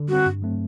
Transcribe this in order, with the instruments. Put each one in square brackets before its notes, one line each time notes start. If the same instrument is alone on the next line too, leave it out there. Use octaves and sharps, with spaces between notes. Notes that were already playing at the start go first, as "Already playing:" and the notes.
Already playing: [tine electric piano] D3
[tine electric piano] G3 C4 [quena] F#4
[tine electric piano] G2
F#3 A3 C4